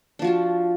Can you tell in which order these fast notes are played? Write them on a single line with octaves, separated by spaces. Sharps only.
D4 F3 F#4 F4